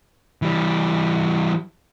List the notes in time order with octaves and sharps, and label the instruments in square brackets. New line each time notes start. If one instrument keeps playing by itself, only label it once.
[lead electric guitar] E3 G3